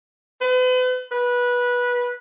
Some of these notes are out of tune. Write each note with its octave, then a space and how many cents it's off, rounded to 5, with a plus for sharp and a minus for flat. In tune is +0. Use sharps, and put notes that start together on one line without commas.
B4 +40
B4 -15